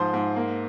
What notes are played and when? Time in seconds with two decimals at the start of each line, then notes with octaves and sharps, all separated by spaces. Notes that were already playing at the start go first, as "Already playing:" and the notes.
Already playing: G#2 F3 C5 C6
0.13 G#2
0.36 A#3